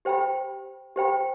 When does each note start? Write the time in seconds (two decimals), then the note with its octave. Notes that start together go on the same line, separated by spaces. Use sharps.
0.05 G4 C5 G5 B5
0.96 G4 C5 G5 B5